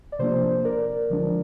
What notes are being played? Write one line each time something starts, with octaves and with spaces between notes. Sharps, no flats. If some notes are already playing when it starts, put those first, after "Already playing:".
D5
C3 F3 A#3 D4 C5
A#4 D5
D3 F3 G#3 D4